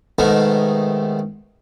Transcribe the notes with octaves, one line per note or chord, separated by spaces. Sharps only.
G#2 B2 D#3 A3